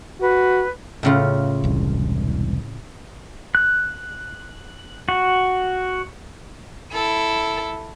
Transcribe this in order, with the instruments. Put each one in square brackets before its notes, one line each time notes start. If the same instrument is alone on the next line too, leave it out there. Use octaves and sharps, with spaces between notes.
[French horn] F#4 [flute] B4
[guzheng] A2 C#3 F4
[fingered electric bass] E1 C2
[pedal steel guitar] F#6
F#4
[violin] E4 A4